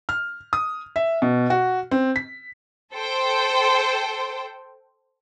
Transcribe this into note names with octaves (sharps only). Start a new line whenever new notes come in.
F6
D#6
E5
B2
F#4
C4
B6
A4 C5 G5